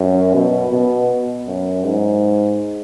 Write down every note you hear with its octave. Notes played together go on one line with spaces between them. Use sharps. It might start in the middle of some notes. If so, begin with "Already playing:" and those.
Already playing: F#2
B2
B2
F#2
G#2